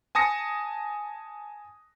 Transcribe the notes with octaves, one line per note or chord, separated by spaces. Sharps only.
G#5 A5 D#6 A#6 C#7